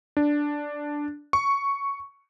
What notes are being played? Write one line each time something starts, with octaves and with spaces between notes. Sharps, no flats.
D4
C#6